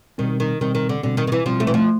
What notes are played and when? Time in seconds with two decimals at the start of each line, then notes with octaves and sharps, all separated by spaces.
0.18 B2 D#3 G3 C4
0.40 D#3
0.61 B2 D#3 G3 C4
0.75 D#3
0.89 D3
1.03 B2 D3 G3 C4
1.17 D#3
1.27 D#3
1.32 E3
1.45 B2 F3 G3 C4
1.60 A3
1.67 E3
1.74 F3